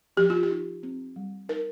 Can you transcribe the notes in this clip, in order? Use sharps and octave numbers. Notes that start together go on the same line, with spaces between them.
F3 G4
F4
G4
D#4
C4
G3
D#4 A#4